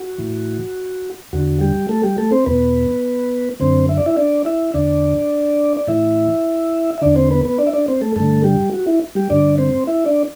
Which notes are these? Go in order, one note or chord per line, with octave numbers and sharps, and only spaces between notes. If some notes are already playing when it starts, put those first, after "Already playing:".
Already playing: F#4
A2 E3
E2 D3 F#4
G3 G4
A3 A4
G3 G4
A3 A4
C4 C5
E2 B2 B3 B4
F#2 D3 C4 C5
E5
D5
E4 E5
D4 D5
E4 E5
E2 D3 D4 D5
D5
A2 E3 E4 E5
E5
E2 D3 D4 D5
C4 C5
B3 B4
B3 B4
D4 D5
E5
D4 D5
C4 C5
A3 A4
G2 D3 A3 A4
G3 G4
F#4
E4
G3 G4
G2 D3 D4 D5
C4 C5
E4 E5
D4 D5